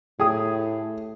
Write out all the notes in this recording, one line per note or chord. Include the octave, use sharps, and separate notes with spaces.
A2 G4 G#4 D#6